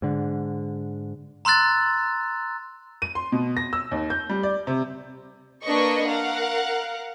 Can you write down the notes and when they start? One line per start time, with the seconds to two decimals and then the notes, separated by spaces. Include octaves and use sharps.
0.02 G#2 D3
1.45 A#5 C6 E6 F#6 A6
3.02 D#7
3.15 C6
3.32 B2
3.57 A#6
3.73 E6
3.92 D#2
4.10 G6
4.29 G3
4.43 D5
4.67 C3
5.64 A#3 D4 B4 D#5 C#6
6.08 A#4 F5 F#5